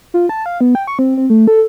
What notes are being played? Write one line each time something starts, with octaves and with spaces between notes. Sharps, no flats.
F4
A5
F5
B3
G5
C#6
C4
C4
A3
A4